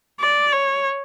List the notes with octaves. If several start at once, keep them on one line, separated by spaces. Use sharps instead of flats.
D5
C#5